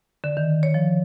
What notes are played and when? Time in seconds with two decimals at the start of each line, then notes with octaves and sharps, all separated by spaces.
0.24 D3
0.37 D#3
0.63 C#5
0.74 F3